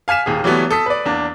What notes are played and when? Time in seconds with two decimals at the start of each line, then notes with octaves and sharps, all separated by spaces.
0.08 F5 G#5 F6 B6 E7
0.26 D#1 D#2 G#4
0.44 E3 F#3 G3 A3 B3
0.71 A4 D#6 B6
0.86 B4 D5
1.06 E2 A#3 D4